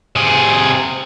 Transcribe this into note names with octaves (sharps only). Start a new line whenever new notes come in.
C3 G#4